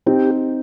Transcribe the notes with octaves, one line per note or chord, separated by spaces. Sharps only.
C4 D#4 G4